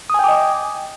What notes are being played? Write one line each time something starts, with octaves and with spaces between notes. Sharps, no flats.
D#5 G5 G#5 D6 D#6